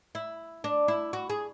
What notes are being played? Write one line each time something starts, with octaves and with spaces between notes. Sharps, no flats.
E4
D4
E4
F#4
G#4